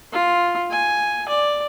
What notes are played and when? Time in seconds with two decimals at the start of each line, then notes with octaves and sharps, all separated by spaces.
0.13 F4
0.71 G#5
1.29 D5